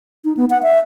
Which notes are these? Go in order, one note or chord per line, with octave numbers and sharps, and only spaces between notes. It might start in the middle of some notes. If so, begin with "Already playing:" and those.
D#4
B3
F#5
E5